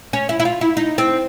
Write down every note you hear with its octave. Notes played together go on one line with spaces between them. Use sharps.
C#4
E4
E4
F4
E4
D#4
C4